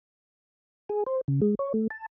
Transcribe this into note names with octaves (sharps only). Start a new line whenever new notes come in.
G#4
C5
C#3
G#3
C#5
A3
A5